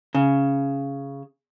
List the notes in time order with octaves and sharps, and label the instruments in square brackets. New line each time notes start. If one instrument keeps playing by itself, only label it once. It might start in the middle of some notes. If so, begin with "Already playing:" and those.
[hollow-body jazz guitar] C#3